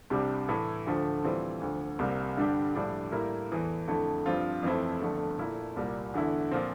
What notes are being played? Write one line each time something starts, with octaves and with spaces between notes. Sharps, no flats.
C2 C3 G3 D4 G4
A2 E3 A3 E4 A4
D2 D3 F3 A3
A2 E3 G3 C4 F4
D2 D3 F3
C2 C3 G3 A#3
G2 D3 G3 D4 G4
A#1 A2 G3 D4
A2 G3 A#3 E4 A#4
E2 E3 A3
F2 D3 A3 E4 A4
G2 F3 C4 F4
F2 E3 A3 C4 E4
G1 F2 D3 A3
A#2 A3 E4 A#4
C2 A#2 G3 A#3
E2 D3 A3 E4
A#2 F3 C4